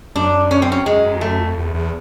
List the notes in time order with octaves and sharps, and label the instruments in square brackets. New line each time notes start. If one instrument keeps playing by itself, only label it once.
[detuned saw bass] F#2 [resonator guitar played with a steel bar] D4
[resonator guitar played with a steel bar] C#4
C4
C#4
[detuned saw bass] F#2 [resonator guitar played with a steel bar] G#3
[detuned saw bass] F#2
F2
[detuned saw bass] F#2 [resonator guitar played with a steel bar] A3
[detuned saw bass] F2
E2
E2